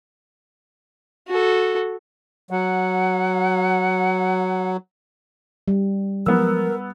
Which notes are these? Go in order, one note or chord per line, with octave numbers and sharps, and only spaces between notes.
F#4 A4
F#3 F#5
G3
F3 F#3 G#3 B3 A#4 E6